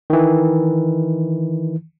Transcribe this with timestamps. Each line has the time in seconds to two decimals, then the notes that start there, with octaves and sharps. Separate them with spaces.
0.10 D#3 E3